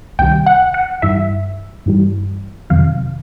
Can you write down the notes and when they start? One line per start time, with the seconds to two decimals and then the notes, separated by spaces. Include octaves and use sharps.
0.19 C#2 C3 D#3 G3 G5
0.46 F#5
0.74 F#5
1.02 G2 E3 G3 E5
1.86 G2 E3 G3
2.70 F2 C3 D#3 F#3 F5